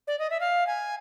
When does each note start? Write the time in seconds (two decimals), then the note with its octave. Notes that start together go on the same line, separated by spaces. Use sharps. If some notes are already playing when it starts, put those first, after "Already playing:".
0.07 D5
0.19 D#5
0.30 E5
0.40 F5
0.67 G#5